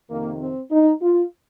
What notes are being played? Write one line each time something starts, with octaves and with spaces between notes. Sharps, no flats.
F2 C3 D#3 A#3
C4
D#4
F4